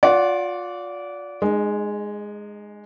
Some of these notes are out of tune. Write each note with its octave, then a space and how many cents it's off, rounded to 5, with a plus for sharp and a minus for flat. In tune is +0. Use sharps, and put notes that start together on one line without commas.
F4 +30 D5 -25 F#5 +0
G#3 +0 D#4 -40